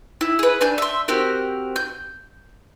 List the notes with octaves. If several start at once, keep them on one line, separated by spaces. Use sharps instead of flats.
E4
G#4 B4
D4 G#5 G6
E5 C6
C4 F#4 G4 A#4
G6